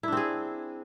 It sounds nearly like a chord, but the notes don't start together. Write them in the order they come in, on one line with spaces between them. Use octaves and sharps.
E4 D4 C4 G#4